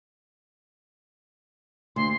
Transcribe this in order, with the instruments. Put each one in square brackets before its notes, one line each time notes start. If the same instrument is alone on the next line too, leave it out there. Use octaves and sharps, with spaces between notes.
[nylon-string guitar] D2 [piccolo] C6